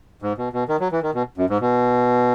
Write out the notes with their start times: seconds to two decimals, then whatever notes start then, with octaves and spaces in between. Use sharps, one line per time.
0.22 G#2
0.38 B2
0.53 B2
0.68 D#3
0.80 F#3
0.92 E3
1.03 D#3
1.15 B2
1.38 F#2
1.50 G#2
1.61 B2